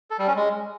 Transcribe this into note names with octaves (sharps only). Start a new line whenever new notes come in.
A4
G3
C#4
G#3